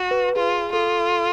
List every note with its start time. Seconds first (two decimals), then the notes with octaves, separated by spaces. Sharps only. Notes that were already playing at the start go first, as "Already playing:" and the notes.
Already playing: F#4
0.11 B4
0.36 F4 G#4
0.73 F4 A4